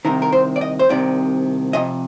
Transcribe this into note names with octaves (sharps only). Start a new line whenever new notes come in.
C2 C3 D#3 A#4
A#4
C5
D5
D#5
C5
C2 C3 D#3 D5
F2 C3 D#5